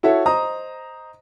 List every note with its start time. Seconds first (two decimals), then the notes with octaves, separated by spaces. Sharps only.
0.03 E4 F#4 A4 C#5 E5
0.26 C5 D#5 A#5 D#6